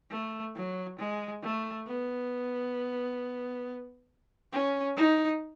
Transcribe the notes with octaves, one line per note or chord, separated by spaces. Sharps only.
A3
F#3
G#3
A3
B3
C#4
D#4